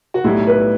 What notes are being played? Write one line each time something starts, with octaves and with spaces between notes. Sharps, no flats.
F#4
B1 A2 G3 E4
B4